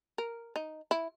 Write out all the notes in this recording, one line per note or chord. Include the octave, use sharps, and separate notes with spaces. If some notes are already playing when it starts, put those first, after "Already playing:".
A#4
D#4
E4